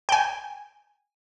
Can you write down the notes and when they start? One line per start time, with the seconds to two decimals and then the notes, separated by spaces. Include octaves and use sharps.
0.09 G5 G#5